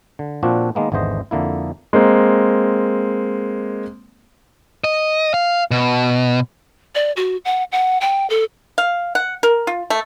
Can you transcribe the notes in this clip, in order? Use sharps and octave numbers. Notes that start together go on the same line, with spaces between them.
D3
A#2 F3 C4 D4 F#4
D#3 G#3 A#3 B3
G#1 E2 D3 E3 C5 D#5
F2 D3 A#3 E4
G#3 A#3 C4
D#5
F5
B2
D5
F#4
F#5
F#5
G5
A4
F5
F#5
A#4
F4
A3